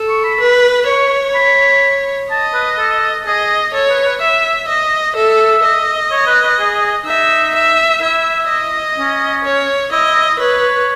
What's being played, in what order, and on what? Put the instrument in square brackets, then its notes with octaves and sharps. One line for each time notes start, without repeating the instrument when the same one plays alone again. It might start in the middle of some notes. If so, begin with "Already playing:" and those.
Already playing: [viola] A4
[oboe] C#6
B5
[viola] B4
[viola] C#5 [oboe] C#6
[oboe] B5
[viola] D#5 [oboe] A5
[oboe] B4
A4
[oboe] G#4 [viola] D#5
[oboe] A4 [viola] C#5
[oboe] B4
B4
[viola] E5
D#5
[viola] A4 [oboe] E5
[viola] D#5
[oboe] C#5
B4
B4
G#4
[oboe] D#4 [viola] E5
[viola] E5
[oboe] E4 [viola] E5
[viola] D#5
[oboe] C#4
[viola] C#5
[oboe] E4 [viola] D#5
[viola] B4 [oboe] C#5